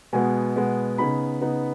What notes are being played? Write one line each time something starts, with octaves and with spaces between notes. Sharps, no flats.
B2 G#3 B3 G#5
B2 G#3 B3
C#3 B3 D#4 B5
C#3 B3 D#4